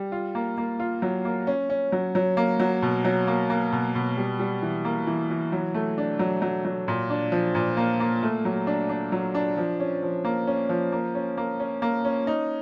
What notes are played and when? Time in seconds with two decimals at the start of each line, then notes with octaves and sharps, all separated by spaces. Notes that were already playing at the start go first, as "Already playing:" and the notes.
Already playing: G3
0.12 F4
0.35 A#3
0.58 A#3
0.80 F4
1.02 F#3
1.25 A#3
1.47 C#4
1.70 C#4
1.92 F#3
2.15 F#3
2.37 A#3
2.60 F#3
2.82 B2
3.05 F#3
3.27 A#3
3.50 A#3
3.72 B2
3.95 B2
4.17 G3
4.39 G3
4.62 E3
4.85 A#3
5.07 E3
5.30 E3
5.52 F#3
5.74 A3
5.98 D4
6.19 F#3
6.42 F#3
6.65 F#3
6.88 A#2
7.10 D4
7.32 F3
7.55 A#2
7.77 A#3
8.00 A#3
8.23 A3
8.45 F#3
8.67 D4
8.89 D4
9.12 F#3
9.35 D4
9.57 F3
9.80 C#4
10.02 F3
10.25 A#3
10.47 C#4
10.69 F3
10.92 A#3
11.15 C#4
11.37 A#3
11.60 C#4
11.82 A#3
12.05 C#4
12.27 D#4